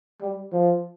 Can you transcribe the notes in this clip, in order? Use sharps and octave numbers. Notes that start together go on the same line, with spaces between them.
G3
F3